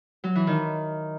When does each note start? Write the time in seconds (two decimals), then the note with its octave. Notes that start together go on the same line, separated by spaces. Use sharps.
0.24 F#3
0.35 E3
0.47 D#3